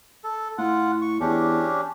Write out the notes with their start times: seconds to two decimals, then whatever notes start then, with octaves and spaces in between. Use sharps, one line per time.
0.24 A4
0.58 A2 F4 F#5
1.02 C#6
1.21 E2 C#4 D4 G4